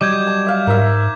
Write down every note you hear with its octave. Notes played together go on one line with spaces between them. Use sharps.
F#3 G3 D#5 D6 G6 G#6
A5
E5 F5
G#2 A#4 E5